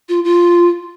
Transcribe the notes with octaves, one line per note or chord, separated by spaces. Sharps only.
F4
F4